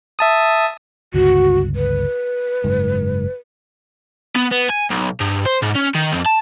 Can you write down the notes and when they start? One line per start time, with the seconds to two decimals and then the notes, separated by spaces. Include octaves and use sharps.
0.19 E5 A5 D#6
1.14 G1 C#2 F#4
1.76 B4
2.64 F#1 G#2
4.36 B3
4.52 B3
4.70 G#5
4.91 B1
5.20 G2
5.46 C5
5.63 G#2
5.76 C#4
5.95 D#3
6.13 F2
6.26 A5